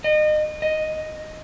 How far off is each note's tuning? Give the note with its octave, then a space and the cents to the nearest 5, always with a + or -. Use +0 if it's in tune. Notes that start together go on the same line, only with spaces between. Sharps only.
D#5 -30
D#5 +0